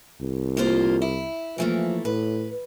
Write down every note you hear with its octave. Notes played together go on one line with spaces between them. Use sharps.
C2
A#3 F4 C5
E4
E3 F3 A3 A#3
A2 B4